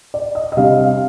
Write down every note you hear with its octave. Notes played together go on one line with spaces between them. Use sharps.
D5
D#5
D#5
C3 G3 D4 F5
F5